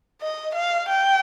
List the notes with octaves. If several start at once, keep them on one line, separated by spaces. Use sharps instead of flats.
D#5
F5
G5